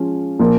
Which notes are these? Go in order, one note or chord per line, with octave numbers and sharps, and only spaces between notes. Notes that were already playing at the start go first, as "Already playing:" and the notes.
Already playing: F3 G#3 C#4 F4
A#2 F3 A#3